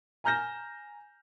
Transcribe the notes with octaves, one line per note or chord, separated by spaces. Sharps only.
G#5 A#5 F6 G6 A#6 E7